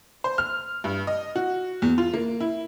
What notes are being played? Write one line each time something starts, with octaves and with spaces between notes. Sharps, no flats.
C5
F6
G2
D#5
F#4
E2
F4
A#3
E4